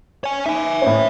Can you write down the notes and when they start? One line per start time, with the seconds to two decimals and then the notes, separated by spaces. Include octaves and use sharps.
0.24 C#5 G#5
0.46 D#4 E5 G#5
0.82 A2 C#4